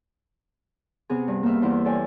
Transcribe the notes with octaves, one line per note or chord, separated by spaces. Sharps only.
C3 B3 C4 G#4
G2
A#3 B3 E5 F5
E2 E4 C5
A4 C#5 D5 G5 G#5